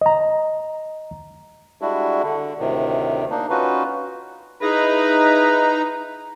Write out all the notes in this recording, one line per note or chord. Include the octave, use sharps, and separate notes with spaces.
D#5 A#5
G3 G#3 D4 E4 F#4
D3
D2 A2 C3 D#3
A#3 D4 D#4
C#4 D#4 F4 F#4 B4
D#4 E4 G#4 B4 A#5